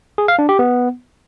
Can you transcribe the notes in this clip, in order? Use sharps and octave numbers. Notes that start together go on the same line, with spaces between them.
G#4
F5
D4
G4
B3